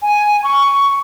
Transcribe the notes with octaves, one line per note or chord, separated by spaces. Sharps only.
G#5
C#6